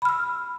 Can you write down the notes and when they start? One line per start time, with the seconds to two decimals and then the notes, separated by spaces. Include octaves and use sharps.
0.02 B5
0.05 F6
0.09 E6